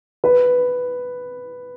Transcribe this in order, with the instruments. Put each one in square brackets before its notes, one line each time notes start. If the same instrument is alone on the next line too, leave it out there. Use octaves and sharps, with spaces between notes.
[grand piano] B4